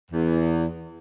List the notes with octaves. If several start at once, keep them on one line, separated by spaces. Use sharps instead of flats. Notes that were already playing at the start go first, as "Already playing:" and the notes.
E2